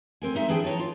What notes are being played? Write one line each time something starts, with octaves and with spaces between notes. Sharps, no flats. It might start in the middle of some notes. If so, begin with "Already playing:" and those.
D2 C4 A#4 G#5
G#3 D#4 E5
E3 D4 E4 G#4 C5 G5
E3 D#4 C#5 A5
F4